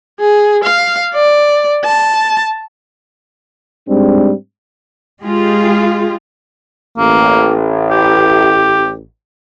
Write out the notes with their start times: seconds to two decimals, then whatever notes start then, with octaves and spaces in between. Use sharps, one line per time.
0.20 G#4
0.64 F5
1.14 D5
1.85 A5
3.88 G#2 G3 G#3 C4 D4
5.23 G#3 F4 G4 G#4
6.98 A1 A#3
7.91 G4